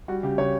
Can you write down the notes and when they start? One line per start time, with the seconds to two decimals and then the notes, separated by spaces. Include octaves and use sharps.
0.08 G3 F#4
0.23 C#3 G4
0.38 C#3 C#5